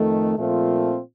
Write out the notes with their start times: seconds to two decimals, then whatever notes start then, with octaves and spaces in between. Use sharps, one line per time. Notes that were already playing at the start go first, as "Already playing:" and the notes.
Already playing: F2 D#3 A3
0.38 A#2 F3 A3 C4 F4